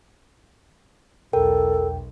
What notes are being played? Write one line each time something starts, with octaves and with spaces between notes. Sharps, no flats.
B1 E2 A4 A#4 G5